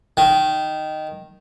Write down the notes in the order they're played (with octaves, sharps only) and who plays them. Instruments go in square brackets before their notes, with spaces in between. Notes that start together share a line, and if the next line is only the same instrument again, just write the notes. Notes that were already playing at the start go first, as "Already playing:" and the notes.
[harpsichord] D#3